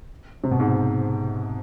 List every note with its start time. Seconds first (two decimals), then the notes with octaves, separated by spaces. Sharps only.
0.44 C3
0.51 B2
0.60 G#2